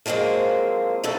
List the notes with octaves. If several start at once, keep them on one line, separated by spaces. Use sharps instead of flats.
F3 F#3 G#3 A#3 C4
F#2 B2 A3 A4